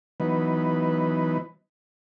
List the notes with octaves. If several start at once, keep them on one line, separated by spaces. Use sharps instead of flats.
E3 F#3 B3 D#4 B4